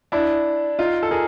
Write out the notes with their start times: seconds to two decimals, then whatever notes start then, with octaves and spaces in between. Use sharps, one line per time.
0.12 D4 E4
0.79 D#4 F4
1.03 A4
1.11 G#4 A#4